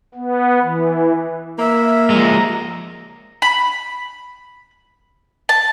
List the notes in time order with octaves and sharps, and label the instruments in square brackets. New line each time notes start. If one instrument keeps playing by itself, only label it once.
[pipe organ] B3
E3
[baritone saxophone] A#3 [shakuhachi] E5
[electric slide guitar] F3 G#3 [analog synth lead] A#5
[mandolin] B5
A5